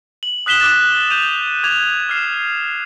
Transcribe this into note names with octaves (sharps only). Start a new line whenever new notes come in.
F#7
D#6 F#6 B6 E7 G7
D6 F#6 A6 E7
G6 D#7 F7
D6 G#6 F7
F6 C7 E7